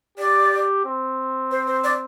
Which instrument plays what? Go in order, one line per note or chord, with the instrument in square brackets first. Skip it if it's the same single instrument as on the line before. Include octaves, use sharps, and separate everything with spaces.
[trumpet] G4 [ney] D5
[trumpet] C4
[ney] C5
C5
D5